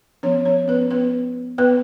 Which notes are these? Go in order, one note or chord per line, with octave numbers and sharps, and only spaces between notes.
F3 B3 C#4 C#5
C#4 C#5
B3 B4
B3 B4
B3 B4